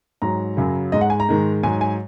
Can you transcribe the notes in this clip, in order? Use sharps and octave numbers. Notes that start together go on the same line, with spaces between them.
G#2 F#3 A#5
F#2 C#3 F#3
G#2 G#3 D#5
F#5
G#5
A#5
G#2 D#3 G#3
G#2 F#3 G#5
G#5